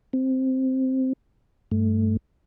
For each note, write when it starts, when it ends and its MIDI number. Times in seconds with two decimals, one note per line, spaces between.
0.13 1.13 60
1.72 2.17 43
1.72 2.17 57